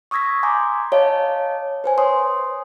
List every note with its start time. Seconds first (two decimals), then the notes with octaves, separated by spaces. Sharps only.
0.11 C#6 D#6 E6 G#6 A#6 B6
0.43 G#5 A#5 C6 D6 G6
0.92 C#5 D#5 F5 A5
1.84 B4 C5 G#5
1.98 C#5 C6 D#6